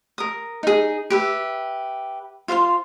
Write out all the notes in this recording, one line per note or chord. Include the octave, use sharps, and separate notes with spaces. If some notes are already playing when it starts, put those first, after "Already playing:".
A#4 D#6
D#4 G#4
G4 B4 E5
F4 C5 F5 C6